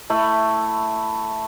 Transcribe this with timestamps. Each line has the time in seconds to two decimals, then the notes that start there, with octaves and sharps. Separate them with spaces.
0.10 A3 E4 B5